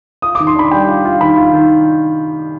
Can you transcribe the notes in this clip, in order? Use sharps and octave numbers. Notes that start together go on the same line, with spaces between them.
F4 D#6
D#3 D6
C6
D4 B5
G3 G5
F4
F4
D#3 B5
F4
D#3